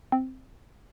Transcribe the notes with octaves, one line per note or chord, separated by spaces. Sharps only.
C4